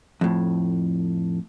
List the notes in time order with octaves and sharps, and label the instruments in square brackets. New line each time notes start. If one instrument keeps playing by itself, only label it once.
[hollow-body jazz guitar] F2 A2